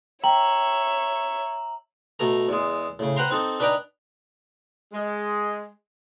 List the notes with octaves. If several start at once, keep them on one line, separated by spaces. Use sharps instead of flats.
C#5 E5 G5 A#5 F#7
B2 A3 A#5
E2 G#3
A2 C#3
B4 C5 F#5 G5 A#5 C6
C4 D#4 A4
D4 D#4 B4 D5 G5 A#5
G#3